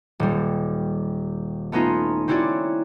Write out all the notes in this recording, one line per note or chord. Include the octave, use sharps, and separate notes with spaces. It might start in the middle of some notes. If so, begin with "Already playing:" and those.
D#1 G3
A3 B3 C#4 D#4 F4
C4 C#4 E4 F#4 C#5 D5